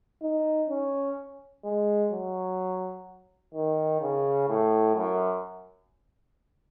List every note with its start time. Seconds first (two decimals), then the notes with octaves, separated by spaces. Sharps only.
0.22 D#4
0.70 C#4
1.64 G#3
2.12 F#3
3.54 D#3
4.01 C#3
4.49 A2
4.96 F#2